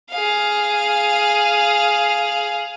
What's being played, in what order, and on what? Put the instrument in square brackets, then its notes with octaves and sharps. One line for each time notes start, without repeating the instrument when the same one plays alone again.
[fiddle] G#4 F5